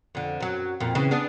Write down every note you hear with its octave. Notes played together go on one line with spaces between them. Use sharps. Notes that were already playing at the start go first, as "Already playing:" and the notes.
F2 D3
F#2 F#3
F2 A#2
C#3 E3
B3 D4 G#4